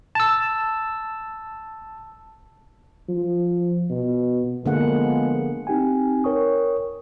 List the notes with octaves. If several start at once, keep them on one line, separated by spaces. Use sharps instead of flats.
A5 E6
F3
B2
D3 F3 G#3 A#3 B3 F#5
C4 D#4 G4 G5 G#5
A#4 C#5 G5 C#6 D#6